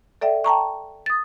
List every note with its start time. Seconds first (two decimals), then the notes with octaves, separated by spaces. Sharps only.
0.21 A4 D5 E5 G5
0.44 G5 A5 A#5 C#6
1.06 D#6 A6